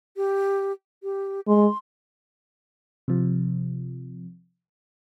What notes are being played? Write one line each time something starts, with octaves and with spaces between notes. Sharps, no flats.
G4
G4
G#3 C6
C3 F3